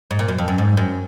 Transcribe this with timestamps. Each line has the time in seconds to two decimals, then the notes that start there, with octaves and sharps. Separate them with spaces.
0.11 G#2
0.19 A#2
0.28 F#2
0.38 F2
0.48 F#2
0.58 G#2
0.77 F#2